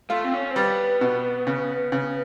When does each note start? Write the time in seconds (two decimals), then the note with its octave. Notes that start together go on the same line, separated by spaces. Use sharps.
0.10 A3 F4
0.24 C4
0.33 C#4
0.51 C4
0.55 G3 B3
1.01 B2
1.47 C#3
1.92 C#3